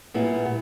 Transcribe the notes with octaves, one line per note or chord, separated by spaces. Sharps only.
A#2 G3 B3 E4
B3